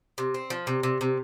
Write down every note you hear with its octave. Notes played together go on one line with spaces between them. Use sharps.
C3
C4
F3
C3
C3
C3